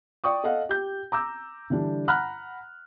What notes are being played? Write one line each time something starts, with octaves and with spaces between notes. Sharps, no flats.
D5 G5 C#6 D#6
A4 D#5 F5 F#5
G4 G6
A#5 D6 E6 G6
D3 E3 G3 D4
F#5 A#5 B5 F6 F#6